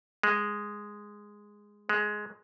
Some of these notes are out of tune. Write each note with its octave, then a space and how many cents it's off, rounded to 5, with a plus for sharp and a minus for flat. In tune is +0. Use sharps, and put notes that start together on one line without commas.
G#3 -5
G#3 +10